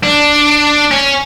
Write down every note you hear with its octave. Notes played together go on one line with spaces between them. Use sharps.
D4
C#4